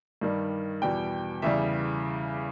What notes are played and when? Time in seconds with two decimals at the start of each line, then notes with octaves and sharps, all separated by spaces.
0.21 G2 D#3 G3
0.82 E2 B2 G3 G5
1.42 E2 C#3 E3 G3 E5